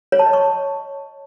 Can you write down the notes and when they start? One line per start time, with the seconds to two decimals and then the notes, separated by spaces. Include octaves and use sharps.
0.12 C#5
0.19 A5
0.26 D#5
0.33 C#6